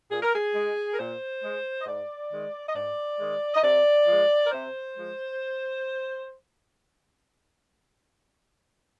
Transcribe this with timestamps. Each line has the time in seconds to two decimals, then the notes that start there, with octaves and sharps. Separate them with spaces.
0.10 A#2 G#4
0.22 A#4
0.34 G#4
0.55 G#3
0.94 A#4
0.98 A#2 C5
1.42 G#3
1.80 D#5
1.86 G#2 D5
2.31 D#3 G#3
2.69 D#5
2.74 G#2 D5
3.19 D#3 G#3
3.54 D#5
3.63 C3 D5
4.06 F3 G#3
4.45 A#4
4.51 C3 C5
4.95 F3 G#3